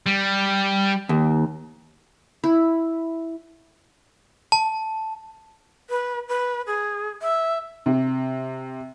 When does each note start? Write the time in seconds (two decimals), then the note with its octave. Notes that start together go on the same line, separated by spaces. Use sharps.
0.06 G3
1.09 D#2
2.44 E4
4.52 A5
5.90 B4
6.29 B4
6.67 G#4
7.22 E5
7.86 C3